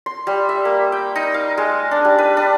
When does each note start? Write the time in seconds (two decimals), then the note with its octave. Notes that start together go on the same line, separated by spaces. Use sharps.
0.06 C6
0.27 G3
0.49 E5
0.65 A#3
0.92 G5
1.16 D#4
1.34 F5
1.58 G#3
1.91 D4
2.05 G3
2.18 B4
2.37 D4